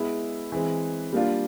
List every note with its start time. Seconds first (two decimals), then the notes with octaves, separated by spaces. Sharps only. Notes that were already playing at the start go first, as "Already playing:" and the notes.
Already playing: G#3 B3 E4
0.52 E3 G#3 C4
1.12 G3 A#3 D4 F4